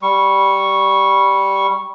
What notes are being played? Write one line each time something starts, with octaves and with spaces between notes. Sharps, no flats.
G3 C#6